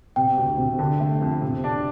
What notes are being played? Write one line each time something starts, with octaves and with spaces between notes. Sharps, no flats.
C3 G5
D2
C3
D3
A3
F2
C3
D4